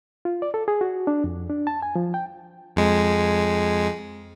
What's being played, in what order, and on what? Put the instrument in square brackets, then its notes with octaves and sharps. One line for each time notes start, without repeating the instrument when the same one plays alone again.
[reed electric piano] F4
D5
A4
G#4
F#4
D4
F2
D4
A5
G#5
F3
G5
[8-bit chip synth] F2 G#3